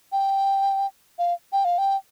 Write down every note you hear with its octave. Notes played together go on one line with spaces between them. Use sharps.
G5
F5
G5
F5
G5